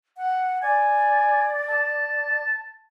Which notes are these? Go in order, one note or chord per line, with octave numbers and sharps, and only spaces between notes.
F#5
D5 G#5
A5